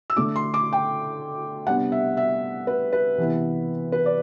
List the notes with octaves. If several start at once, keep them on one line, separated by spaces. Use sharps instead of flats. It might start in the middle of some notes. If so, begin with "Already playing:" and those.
E6
D3 A3 D4 D6
C6
D6
G5
C3 G3 B3 D4 F#5
E5
E5
B4
B4
C3 E3 B3 E4
B4
D5